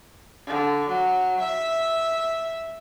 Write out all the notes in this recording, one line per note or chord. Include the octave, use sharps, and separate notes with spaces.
D3
F#3
E5